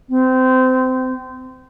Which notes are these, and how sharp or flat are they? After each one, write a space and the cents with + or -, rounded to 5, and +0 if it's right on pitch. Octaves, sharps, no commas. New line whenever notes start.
C4 -25